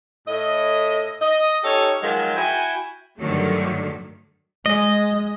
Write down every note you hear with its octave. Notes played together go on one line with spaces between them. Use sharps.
A2 D#5
D#5
C#4 D#4 G4 A4 C#5
D#3 F3 F#3 G#3
E4 F#4 G5 G#5
G2 D3 D#3 F#3 A3
G#3 D#5